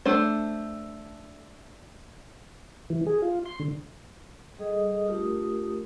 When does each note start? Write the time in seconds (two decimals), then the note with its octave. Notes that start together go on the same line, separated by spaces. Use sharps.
0.05 A3 D4 C5
2.90 E3
3.06 G#4
3.22 F4
3.46 C6
3.60 D3
4.59 G3 G#4 A4 D#5 D#6
5.06 A3 D4 F4 G4 A#4 D#6